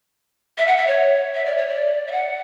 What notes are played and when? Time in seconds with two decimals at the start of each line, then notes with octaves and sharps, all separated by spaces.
0.58 E5
0.67 F#5
0.77 E5
0.87 C#5
1.35 E5
1.45 D5
1.57 C#5
1.68 D5
2.07 E5
2.12 F#5